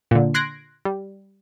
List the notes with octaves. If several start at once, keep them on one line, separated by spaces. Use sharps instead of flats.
A#2 D3
C6 F#6 G#6 A#6 C7 D7
G3